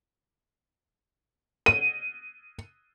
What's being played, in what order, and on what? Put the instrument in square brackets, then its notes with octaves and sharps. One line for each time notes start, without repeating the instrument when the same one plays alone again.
[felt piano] D#7